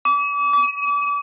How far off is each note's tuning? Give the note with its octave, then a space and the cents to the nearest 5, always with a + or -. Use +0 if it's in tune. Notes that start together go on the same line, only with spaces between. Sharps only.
D6 -35
D6 -40